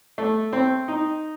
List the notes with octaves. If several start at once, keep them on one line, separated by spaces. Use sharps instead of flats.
A3
C4
D#4